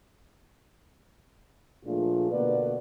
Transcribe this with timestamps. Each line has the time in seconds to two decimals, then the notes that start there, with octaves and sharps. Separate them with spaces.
1.85 A#2 F3 A3 D4 F4 G#4
2.31 B2 D3 A#3 B4 D5